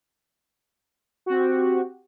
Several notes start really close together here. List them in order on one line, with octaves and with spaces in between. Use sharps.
F#4 C4 G4